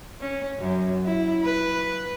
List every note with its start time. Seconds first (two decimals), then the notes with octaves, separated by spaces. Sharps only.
0.20 C#4
0.60 F#2
1.05 E4
1.43 B4